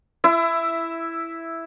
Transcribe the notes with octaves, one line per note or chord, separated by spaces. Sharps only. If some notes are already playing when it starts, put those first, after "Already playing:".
E4 E5